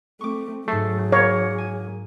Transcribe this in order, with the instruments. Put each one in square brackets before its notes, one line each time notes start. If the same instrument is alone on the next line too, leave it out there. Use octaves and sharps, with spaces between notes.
[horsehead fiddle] A3 C4 [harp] C#6 D6
[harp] G#2 C7 [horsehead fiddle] F#3 G#4 [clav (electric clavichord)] A3
[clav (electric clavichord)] A#3 [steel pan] C#5
[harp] G#5